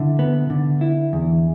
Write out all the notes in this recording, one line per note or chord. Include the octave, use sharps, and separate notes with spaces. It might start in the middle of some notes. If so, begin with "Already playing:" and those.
Already playing: D3 E4
B3
D3
E4
E2